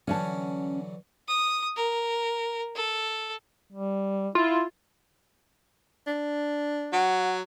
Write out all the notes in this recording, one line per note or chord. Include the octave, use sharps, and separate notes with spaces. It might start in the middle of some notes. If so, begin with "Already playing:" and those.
D3 E3 F#3 C#4 F#5 A5
D#6
A#4
A4
G3
E4 F4
D4
F#3 F#5